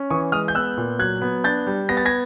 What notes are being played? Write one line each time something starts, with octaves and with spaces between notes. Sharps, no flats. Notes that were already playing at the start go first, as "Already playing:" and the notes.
Already playing: C#4
E3 C#6 D#6
G#3 D#6 F6
G6
B3 E6 F#6
A#2
F#3 F#6 G#6
B3
D4 G6 A6
G3
B3 A#6
A6
G#6 A#6